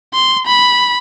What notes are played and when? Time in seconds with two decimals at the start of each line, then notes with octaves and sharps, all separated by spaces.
0.13 C6
0.46 B5